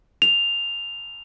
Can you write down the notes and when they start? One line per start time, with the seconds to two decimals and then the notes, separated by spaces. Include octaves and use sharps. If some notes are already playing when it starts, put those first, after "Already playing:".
0.22 F7